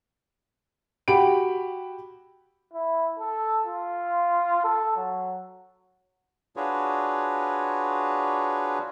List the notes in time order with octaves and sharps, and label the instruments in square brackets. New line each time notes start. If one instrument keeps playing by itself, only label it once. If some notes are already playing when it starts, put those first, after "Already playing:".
[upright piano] F#4 G4 B5 D7
[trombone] E4
A4
F4
A4
F#3
[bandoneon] D4 F4 F#4 G#4 B4 C#5